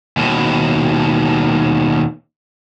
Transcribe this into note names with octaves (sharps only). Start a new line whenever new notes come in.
D#2 B2